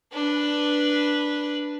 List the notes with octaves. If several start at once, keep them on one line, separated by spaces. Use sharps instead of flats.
D4 B4